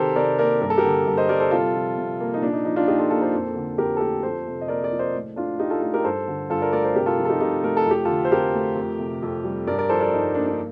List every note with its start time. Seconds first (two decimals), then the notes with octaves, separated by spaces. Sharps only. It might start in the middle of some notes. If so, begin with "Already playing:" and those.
Already playing: C3 D#3 G4 A4 A#4 C5
0.16 C3 A#4 D5
0.39 A#3 A#4 D5
0.61 G2 A#4
0.70 A4
0.78 G4 A#4
0.84 D3
1.07 G2
1.17 C5 D#5
1.29 G3 A#4 D5
1.40 A4 C5
1.51 C3 F4 A4
1.74 F3
1.97 C3
2.20 A#3
2.34 D#4
2.42 A#2 D4
2.53 D#4
2.65 F3 D#4
2.76 D4 F4
2.88 A#2 D#4 G4
2.99 F4 A4
3.10 A#3 F4 A4
3.21 A4 C5
3.34 F2
3.56 D3
3.78 F2 G4 A#4
3.97 A4
4.00 A3 G4 A#4
4.23 F2 A4 C5
4.47 C3
4.61 D#5
4.68 A#3 A#4 D5
4.83 A#4 D5
4.91 F3
4.99 C5 D#5
5.14 A2
5.36 A3 D4 F4
5.59 A3 D#4 G4
5.70 F4 A4
5.82 A2 F4 A4
5.94 G4 A#4
6.04 G2 A4 C5
6.28 D3
6.50 G2 F4 A4
6.62 A#4 D5
6.72 A3 A#4 D5
6.84 A4 C5
6.95 C3 G4 A#4
7.06 F4 A4
7.18 F3
7.25 A4
7.29 D#4 G4
7.40 C3 D#4 G4
7.64 A3 A#4
7.77 A4
7.86 F2 G4
8.05 D3 F4 A4
8.25 C5
8.32 F2 G4 A#4
8.54 A3
8.76 F2
8.99 C3
9.22 F2
9.44 G3
9.67 G2 A#4 D5
9.78 A#4 D5
9.89 F3 A4 C5
10.00 A#4 D5
10.12 G2 D#4
10.34 A#3 D4
10.47 D4